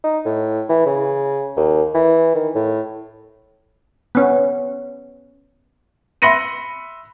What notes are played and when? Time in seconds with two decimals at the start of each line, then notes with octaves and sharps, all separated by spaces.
0.04 D#4
0.25 A2
0.69 E3
0.86 C#3
1.56 D#2
1.94 E3
2.35 D#3
2.55 A2
4.15 B3 C#4
6.22 E5 B5 C6 A#6 C#7 D#7